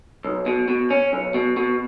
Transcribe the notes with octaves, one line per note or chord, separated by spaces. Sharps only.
B1
B2
B2
C#4
B1
B2
B2